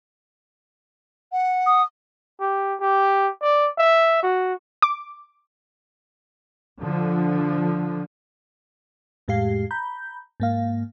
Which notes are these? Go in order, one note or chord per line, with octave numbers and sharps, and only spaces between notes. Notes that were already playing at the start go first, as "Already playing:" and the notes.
F#5
D#6
G4
G4
D5
E5
F#4
D6
D3 F3
F2 A2 G#3 G4 F5 C7
A#5 B5 G6
G#2 A#3 F5